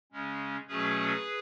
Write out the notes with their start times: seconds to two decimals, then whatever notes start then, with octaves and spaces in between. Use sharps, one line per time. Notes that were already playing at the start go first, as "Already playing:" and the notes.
0.12 C#3 G#3 C#4
0.68 B2 F#3 A3 C#4 G#4 B4